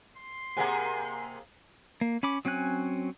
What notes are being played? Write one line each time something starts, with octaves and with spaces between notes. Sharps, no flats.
C6
C3 A#3 G#4 A#4 F#5 G#5 A#5
A#3
C#4 B5 D6
F#3 C4 C#4 G#5 F#6